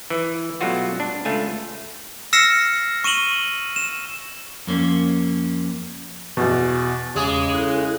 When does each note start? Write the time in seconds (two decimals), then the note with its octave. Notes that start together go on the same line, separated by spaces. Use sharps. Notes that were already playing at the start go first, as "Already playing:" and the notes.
0.10 E3
0.61 B2 F#3 G3 A3 F4 F#4
1.00 D4
1.25 C#2 A3 F4 G#5
2.33 E6 F6 A#6 C7 C#7 E7
3.04 C#6 D#7 E7 F#7 G7
3.76 E7
4.67 F2 A#3 C#4
6.37 E2 B2
7.16 E2 C#3 G#3 G#4 D6
7.53 E4 A4 F#6